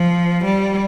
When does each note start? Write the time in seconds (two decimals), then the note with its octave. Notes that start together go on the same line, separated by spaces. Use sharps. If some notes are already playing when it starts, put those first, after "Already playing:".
Already playing: F3
0.45 G3